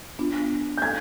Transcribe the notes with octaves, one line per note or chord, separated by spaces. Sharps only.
B3 D4 F4
G6
G#6